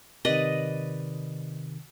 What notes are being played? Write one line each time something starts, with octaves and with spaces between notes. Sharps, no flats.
C3 D#3 B4 D5 D#5